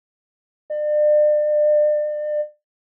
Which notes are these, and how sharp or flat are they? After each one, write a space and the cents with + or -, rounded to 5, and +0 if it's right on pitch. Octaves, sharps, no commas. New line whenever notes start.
D5 +35